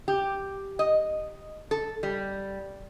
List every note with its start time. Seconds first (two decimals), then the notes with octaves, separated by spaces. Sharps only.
0.08 G4
0.79 D#5
1.71 A4
2.03 G3